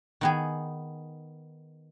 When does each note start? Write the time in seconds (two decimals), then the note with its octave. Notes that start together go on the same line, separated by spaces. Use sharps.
0.21 D#3 B3 G#4